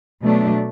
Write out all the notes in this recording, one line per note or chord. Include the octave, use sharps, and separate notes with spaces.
B2 F#3 A3 D4